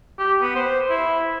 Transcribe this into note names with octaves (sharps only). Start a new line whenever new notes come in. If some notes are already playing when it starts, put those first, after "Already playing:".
G4
B3
C5
E4